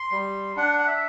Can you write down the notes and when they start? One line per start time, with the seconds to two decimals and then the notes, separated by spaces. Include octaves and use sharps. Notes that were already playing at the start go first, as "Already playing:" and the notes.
Already playing: C6
0.12 G3
0.56 D4 F#5
0.79 F#5
0.87 E5